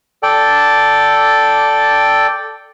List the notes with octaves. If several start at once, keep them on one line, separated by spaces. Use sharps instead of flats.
A4 D5 G5